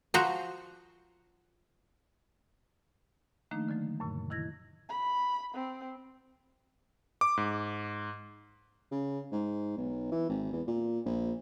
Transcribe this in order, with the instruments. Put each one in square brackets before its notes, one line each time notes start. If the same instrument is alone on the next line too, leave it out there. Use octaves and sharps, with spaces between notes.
[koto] F3 F#4 C5 A#5
[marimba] D#3 F3 A3 A#3 D4 D#4
D3 E3 F#3 A3
F#2 A#2 C#3
D#3 E4 G#6 A#6
[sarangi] B5
C4
[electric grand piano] D6
G#2
[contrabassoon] C#3
G#2
B1
E3
G#1
E2
A#2
A#1